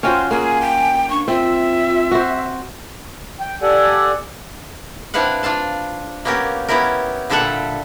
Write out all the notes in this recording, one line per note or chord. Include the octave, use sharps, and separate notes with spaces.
C#4 F4 F#4 C5 G5
A#3 G#4 G#5
G5
D4 C#6
C4 F4 E5
F#4 C5
G5
G4 A4 D5 F#5 G#5
C4 D4 E4 B4 F5 F#5
D4 F4 F5 A5
A#3 B3 C#4 G4 A#4
B3 C#4 E4 G4 A#4
A#2 D3 G3 A4 E5 F#5